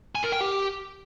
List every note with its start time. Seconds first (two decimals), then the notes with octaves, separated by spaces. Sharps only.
0.15 G#5
0.24 A#4
0.32 G5
0.41 G4